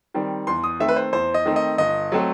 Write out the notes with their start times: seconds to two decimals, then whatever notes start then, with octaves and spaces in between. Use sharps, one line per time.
0.14 D#3 G3 C4
0.47 E2 C6
0.64 D#6
0.80 D#3 A3 C4 E5
0.88 B4
0.96 C5
1.13 E2 C5
1.34 D#5
1.45 D#3 A3 C4
1.56 D#5
1.78 G1 D#5
2.12 F#3 A3 C4